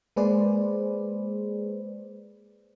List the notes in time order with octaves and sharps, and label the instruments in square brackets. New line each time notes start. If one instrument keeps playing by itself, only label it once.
[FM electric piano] G#3 A#3 G#4 B4 C5 D5